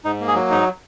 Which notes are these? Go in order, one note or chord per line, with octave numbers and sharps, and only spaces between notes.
G#2 D#4
A#3
G#4
F#3
G#2 D#4